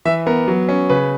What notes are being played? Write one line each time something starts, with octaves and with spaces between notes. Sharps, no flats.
E3 E5
B3 A#4
F#3
C#4
C#3 B4